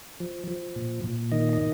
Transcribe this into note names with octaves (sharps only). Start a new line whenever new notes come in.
F3
F3
A#2
A#2
D#3 D#5
D#5